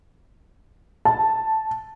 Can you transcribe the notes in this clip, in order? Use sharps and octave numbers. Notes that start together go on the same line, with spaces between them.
A5